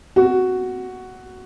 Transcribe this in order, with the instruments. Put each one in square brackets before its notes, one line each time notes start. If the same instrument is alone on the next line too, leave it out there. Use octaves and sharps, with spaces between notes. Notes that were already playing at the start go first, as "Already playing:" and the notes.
[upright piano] F#4